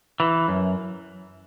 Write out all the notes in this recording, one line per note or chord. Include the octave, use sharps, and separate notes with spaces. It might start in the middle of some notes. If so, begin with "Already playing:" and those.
E3
F#2